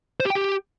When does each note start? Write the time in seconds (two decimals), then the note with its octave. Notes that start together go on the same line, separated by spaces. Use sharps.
0.20 C5
0.25 G4
0.30 G5
0.35 G4